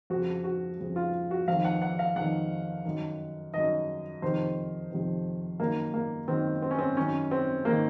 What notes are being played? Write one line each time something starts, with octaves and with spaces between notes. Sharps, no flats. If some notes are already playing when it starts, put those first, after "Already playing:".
F2 C#3 F#4
F#4
F2 C#3
F4
F#4
F2 D#3 F5
F#5
F#5
F5
F2 D#3 F#5
F#2 D#3
F#2 D#3 D#5
F2 C3 D#3 C5
F2 C3 D#3
F#2 D#3 A#3
A#3
F#2 D#3 C4
C4
C#4
C4
F#2 D#3 C#4
C4
D#3 A#3